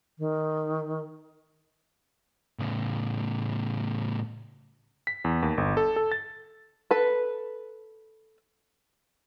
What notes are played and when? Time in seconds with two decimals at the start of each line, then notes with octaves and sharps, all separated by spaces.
0.19 D#3
2.59 A2 C#3
5.07 B6
5.24 E2
5.43 D#2
5.58 G1
5.77 A4
5.96 A4
6.12 A6
6.91 A4 B4